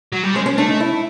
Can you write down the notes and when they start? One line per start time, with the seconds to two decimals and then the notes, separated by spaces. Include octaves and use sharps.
0.13 F#3
0.23 G3
0.34 G#3 C#4
0.46 C#4
0.58 A3 D4
0.69 D#4
0.80 E4